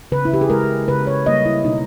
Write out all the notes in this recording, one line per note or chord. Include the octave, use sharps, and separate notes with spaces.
C#3 B4
E4
G4
G#4
G#3 A#4
C#3 B4
C#5
G3 A#3 D#5
E4
B2 D#4